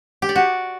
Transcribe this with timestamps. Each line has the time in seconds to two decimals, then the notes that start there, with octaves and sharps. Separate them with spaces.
0.22 G4
0.29 D5
0.36 F#4